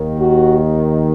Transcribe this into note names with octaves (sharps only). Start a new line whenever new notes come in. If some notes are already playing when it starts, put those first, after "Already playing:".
Already playing: D#2 D#3
F#4